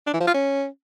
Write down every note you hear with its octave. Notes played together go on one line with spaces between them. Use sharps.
D4
E3
F3
F4
C#4